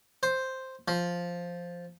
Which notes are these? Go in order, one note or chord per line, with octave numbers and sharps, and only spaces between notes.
C5
F3